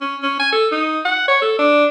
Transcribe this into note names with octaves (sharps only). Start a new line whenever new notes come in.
C#4
C#4
G#5
A4
D#4
F#5
C#5
A4
D4